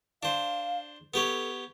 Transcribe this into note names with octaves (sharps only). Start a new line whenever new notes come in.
D4 C5 F5
B3 G4 A4 C#5